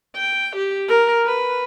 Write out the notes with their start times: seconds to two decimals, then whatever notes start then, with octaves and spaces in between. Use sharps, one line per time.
0.16 G5
0.56 G4
0.89 A#4
1.26 B4